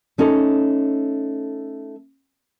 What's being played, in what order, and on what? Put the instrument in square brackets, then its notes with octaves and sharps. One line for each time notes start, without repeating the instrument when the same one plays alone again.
[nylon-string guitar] A3 C#4 D#4 A4